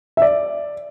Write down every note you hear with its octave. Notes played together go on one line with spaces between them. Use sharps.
E5
D5